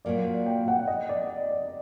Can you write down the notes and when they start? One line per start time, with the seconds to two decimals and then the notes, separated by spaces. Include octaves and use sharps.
0.05 A#2 F#3 A#3 D5
0.46 G5
0.68 F#5
0.87 D#5
1.09 D5
1.51 D5